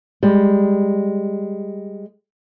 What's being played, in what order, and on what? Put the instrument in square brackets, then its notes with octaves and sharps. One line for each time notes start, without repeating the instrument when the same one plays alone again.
[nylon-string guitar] G3 G#3